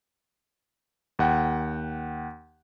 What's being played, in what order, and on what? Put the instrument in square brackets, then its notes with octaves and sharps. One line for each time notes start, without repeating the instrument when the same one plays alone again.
[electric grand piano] D#2 F#5 G5